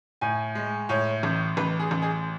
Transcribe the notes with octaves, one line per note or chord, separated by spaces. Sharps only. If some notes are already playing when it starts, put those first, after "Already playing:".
A2 G#5
G#3
A2 C#5
A1
A1 B4
G#4
A1
G#4